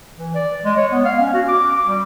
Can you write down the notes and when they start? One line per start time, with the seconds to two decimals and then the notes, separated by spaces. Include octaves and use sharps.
0.17 E3
0.34 D5
0.65 G#3
0.77 C#5
0.92 B3
1.05 F5
1.20 C#4
1.34 F#4
1.48 D6
1.72 D6
1.87 G3